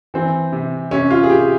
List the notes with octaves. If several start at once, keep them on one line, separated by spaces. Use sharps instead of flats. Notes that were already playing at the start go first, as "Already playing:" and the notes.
E3 C4
C3
C3 C#4
F4
G#4
C3 G4